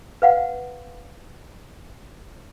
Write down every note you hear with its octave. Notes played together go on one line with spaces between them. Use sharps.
B4 F5 F#5